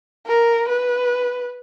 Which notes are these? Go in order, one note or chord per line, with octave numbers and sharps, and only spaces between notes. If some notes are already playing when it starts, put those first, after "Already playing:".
A#4
B4